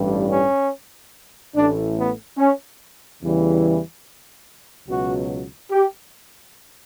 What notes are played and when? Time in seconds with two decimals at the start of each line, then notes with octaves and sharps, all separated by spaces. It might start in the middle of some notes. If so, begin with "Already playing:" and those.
Already playing: A1 G2 E3 G3
0.30 C#4
1.55 A1 A2 E3 A3 D4
1.96 B3
2.38 C#4
3.22 E2 C#3 E3 G3
4.88 C#2 B2 F#3 F#4
5.71 G4